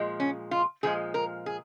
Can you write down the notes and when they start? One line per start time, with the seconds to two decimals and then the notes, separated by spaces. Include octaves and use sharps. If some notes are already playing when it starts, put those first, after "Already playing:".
Already playing: A#2 F3 G#3
0.20 C#4
0.51 F4
0.83 A#2 F3 G#3 G#4
1.14 A#4
1.46 G#4